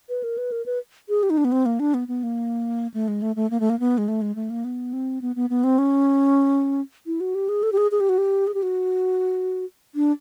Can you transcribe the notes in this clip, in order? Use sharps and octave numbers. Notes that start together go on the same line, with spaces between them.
B4
A#4
B4
A#4
B4
G#4
G4
D#4
D4
B3
C4
A#3
D4
B3
B3
A#3
A3
G#3
A3
A3
A#3
A3
A#3
B3
G#3
A3
G#3
A3
A#3
B3
C4
B3
B3
B3
C4
C#4
E4
F#4
G4
G#4
A4
G4
G#4
G#4
G4
F#4
G4
G#4
G4
F#4
D4